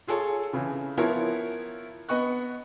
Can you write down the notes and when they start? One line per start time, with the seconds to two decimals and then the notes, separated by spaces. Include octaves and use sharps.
0.07 F4 G#4 A4 C#5
0.53 C#3 E3
0.97 F3 B3 E4 A#4 C#5
2.09 B3 D#5 C#6 F#6